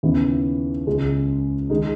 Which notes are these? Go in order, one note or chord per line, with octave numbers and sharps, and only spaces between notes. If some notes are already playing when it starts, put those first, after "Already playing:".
D#2 C#3 E3 B3
C#2 C#3 G#3 C#4
D#3 G#3 D#4